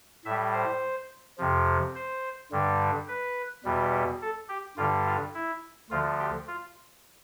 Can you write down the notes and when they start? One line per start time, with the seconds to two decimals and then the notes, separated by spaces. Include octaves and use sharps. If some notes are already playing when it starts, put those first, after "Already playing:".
0.25 A2 E5
0.29 G3
0.53 C5
1.38 F2 C3 F3
1.95 C5
2.52 G2 D3 G3
3.08 B4
3.64 E2 B2 G3
4.22 A4
4.49 G4
4.77 G2 D3 G3 F4
5.06 F4
5.34 E4
5.90 D2 D3 F3 F4
6.19 G4
6.48 F4